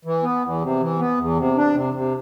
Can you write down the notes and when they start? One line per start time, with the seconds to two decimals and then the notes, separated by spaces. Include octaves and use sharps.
0.05 E3
0.23 B3
0.43 E2
0.62 C3
0.80 E3
0.99 B3
1.18 E2
1.37 C3
1.56 D4
1.74 C3
1.94 C3